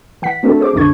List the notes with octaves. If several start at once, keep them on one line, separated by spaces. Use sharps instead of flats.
E3 F#5 B6
A3 C4 D4 F#4 A4
G#4 C5 D6
B1 F#2 D3 D4 C#6 G#6